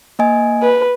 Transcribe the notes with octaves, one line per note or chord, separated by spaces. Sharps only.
A#3 D#5 G#5
B4